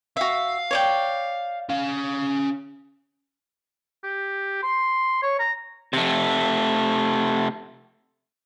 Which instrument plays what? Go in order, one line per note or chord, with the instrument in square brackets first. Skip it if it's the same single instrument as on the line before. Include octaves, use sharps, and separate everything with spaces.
[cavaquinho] F#4 E5 [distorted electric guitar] F5
[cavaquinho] C#5 D5 G5
[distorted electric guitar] C#4 F5
[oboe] G4
C6
C#5
A#5
[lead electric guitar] C3 A3